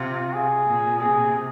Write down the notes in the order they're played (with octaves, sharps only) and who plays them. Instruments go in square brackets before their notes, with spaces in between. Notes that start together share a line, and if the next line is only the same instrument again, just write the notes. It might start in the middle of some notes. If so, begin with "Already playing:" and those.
Already playing: [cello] C3 [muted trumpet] F4
[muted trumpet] G#4
[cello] A#2
[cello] C3 [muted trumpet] G#4